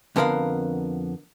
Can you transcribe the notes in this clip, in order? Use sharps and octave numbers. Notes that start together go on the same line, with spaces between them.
F2 D3 B3 A#4 F5 B5